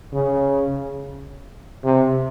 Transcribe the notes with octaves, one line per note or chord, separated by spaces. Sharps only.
C#3
C3